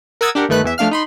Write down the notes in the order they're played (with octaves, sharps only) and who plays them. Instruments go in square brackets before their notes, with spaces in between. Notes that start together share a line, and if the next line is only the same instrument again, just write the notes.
[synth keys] A#4 F#5 D#6 E6 G#6 A6
D4 G4 A#4 F#5
G1 D#3 A3 B4 F#6
E2 E3 E5
F3 A3 D4 F5 F6
D#4 B5 C6